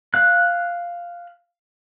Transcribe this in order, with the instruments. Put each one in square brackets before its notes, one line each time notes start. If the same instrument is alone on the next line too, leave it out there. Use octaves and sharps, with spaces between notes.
[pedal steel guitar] F5 F#6